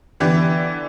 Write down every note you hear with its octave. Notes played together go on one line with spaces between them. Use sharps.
D3 E3 B3 G4